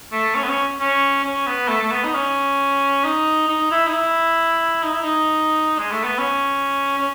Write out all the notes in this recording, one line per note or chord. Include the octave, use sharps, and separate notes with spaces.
A3
C#4
B3
C#4
C#4
C#4
B3
A3
A3
B3
D#4
C#4
D#4
D#4
E4
D#4
E4
D#4
E4
D#4
G#3
A3
B3
C#4
C#4